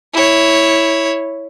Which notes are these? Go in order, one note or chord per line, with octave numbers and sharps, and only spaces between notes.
E4 C#5